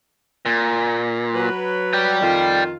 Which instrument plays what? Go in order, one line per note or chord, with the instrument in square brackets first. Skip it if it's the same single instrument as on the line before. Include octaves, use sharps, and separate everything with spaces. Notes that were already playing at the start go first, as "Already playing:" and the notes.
[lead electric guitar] A#2
[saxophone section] F#3 B4
[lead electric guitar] D5 G5
[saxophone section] F2 D#3 F4